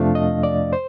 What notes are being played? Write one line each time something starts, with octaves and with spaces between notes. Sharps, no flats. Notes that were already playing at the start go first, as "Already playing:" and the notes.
Already playing: F2 C3 F3 A3 D4 F5
D#5
D5
C5